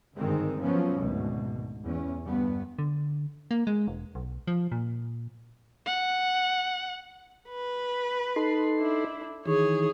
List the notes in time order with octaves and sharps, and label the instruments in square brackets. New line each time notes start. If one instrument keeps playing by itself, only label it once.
[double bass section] G#1 G2 D3 D#3 G#3 C4
F3 F#3 B3 C#4
G#1 D2 B2
E2 C#4
G1 G2 B3
[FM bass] D3
A#3
G#3
E1
B1
F3
A#2
[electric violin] F#5
[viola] B4
[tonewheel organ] D#4 A4 C6
[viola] D4 E4
[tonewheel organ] D#3 E3 [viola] G#4 C#5